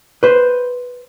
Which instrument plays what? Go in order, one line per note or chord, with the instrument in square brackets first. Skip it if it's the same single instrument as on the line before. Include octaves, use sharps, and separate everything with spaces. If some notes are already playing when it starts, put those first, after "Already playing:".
[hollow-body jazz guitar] B4 C5